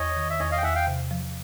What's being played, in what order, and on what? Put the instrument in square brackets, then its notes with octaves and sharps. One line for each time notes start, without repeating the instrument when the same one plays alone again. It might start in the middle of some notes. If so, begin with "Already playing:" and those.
Already playing: [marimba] E2 [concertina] C#5 D#5
[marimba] D#3
[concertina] E5
[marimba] E2 [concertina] C#5 D#5
[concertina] D#5 F5
G5
[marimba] E2 [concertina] E5 F#5
[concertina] F5 G5
[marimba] C3
F3